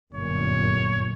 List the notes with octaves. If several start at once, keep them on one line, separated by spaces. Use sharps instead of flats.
G1 F#2 A#2 C#5